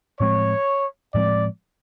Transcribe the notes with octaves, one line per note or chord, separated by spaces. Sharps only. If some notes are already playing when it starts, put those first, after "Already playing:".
A2 F3 G#3 C4 C#5
A2 F3 G#3 C4 D5